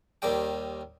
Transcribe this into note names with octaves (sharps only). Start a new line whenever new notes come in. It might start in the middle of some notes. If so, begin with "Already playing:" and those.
D#2 D#3 G3 G5